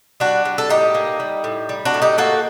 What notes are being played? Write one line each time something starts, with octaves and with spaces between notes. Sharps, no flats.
G3 D4 F#4
G3
A4
A2 D#4 G4
A#3
G3
A2
G3
D4 F#4
A2
D#4 G4
A#3 F#4 A4